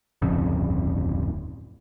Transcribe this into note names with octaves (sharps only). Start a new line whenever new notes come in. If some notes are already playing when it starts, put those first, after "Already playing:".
D1 G1 F2 C#3